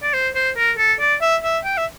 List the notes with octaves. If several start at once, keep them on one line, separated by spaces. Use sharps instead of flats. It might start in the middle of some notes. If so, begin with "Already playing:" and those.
D5
C5
C5
A#4
A4
D5
E5
E5
G5
E5